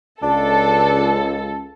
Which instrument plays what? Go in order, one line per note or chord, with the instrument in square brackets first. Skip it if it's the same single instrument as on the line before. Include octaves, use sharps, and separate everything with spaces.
[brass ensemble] C#2 [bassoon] D4 [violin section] A4